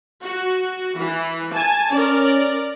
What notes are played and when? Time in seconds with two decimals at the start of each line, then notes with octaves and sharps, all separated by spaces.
0.23 F#4
0.97 E3
1.53 G#5 A5
1.92 C#4 A#4 D5